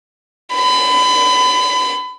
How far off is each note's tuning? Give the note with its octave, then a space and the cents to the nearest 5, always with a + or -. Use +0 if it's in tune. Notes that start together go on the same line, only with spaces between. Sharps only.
B5 +30